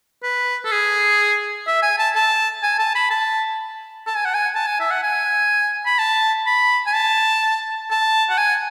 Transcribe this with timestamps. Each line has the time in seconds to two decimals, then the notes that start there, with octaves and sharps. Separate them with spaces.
0.23 B4
0.65 A4
0.71 G#4
1.67 E5
1.82 G#5
1.98 A5
2.15 A5
2.63 G#5
2.79 A5
2.95 B5
3.11 A5
4.07 A5
4.16 G#5
4.25 F#5
4.34 G#5
4.55 A5
4.67 G#5
4.80 E5
4.91 F#5
5.03 G#5
5.86 B5
5.99 A5
6.46 B5
6.86 G#5
6.95 A5
7.91 A5
8.30 F#5
8.38 G#5